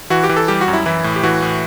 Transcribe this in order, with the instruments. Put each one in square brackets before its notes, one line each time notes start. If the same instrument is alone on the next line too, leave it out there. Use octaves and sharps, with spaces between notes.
[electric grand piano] E3 F#4
G4
E3
A4
G3 G4
F#4
F#2
E4
E3 E4
A2
G4
E3 F#4
A2